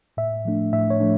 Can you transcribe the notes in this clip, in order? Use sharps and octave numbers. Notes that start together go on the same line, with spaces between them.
A2 E5
F3 A3 D4
A2 E5
C#5
F3 A3 D4